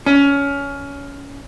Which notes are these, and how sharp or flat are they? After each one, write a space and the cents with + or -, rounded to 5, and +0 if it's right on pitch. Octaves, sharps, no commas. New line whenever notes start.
C#4 +20